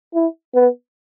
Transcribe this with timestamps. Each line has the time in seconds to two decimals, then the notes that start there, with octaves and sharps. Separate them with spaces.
0.15 E4
0.55 B3